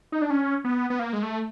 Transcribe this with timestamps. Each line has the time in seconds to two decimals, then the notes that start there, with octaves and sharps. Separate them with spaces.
0.12 D#4
0.22 D4
0.30 C#4
0.64 B3
0.90 B3
0.99 A#3
1.13 G#3
1.23 A3